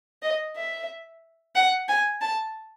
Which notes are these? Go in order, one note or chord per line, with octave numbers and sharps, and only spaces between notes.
D#5
E5
F#5
G#5
A5